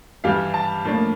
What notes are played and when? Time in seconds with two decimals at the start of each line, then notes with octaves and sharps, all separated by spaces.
0.24 G2 E3 G3 F5
0.54 A5
0.84 A2 F3 A#3 D4